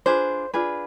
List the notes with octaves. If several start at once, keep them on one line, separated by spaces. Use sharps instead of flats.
D4 F4 G#4 B4 C5
D4 F4 G#4 B4